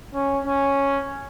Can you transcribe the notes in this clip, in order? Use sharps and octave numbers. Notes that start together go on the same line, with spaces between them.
C#4
C#4